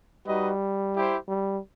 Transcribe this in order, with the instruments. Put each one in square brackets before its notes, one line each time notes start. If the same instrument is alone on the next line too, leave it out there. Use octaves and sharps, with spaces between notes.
[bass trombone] G3 [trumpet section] D#4 F#4 B4 D#5
[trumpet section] E4 G4 C5
[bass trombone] G3